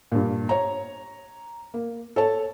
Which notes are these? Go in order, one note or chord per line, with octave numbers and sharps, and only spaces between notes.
G2 A#2
C#5 A#5
A#3
A4 C#5 A5